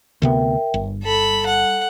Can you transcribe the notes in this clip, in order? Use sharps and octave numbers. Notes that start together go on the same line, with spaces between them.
D2 C3 B3 A#4 E5 G5
G1
G3 A4 B5
F#5